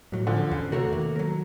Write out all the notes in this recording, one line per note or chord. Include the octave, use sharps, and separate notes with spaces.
B1 A2 F#3
D3 F3
E2 C#3
C3 A3 F#4 A#4 C#5
D#3 A#3
F#3 A#4